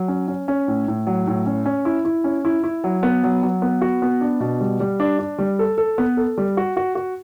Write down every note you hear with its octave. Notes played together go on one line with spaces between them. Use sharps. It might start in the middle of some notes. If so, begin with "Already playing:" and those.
Already playing: F#3
C#4
C#4
C#4
A2
A2
F#3
A2
C#4
C#4
E4
E4
C#4
E4
E4
F#3
B3
F#3
F#3
B3
F#4
B3
D4
B2
G3
G3
D4
D4
G3
A4
A4
B3
A4
G3
F#4
F#4
F#4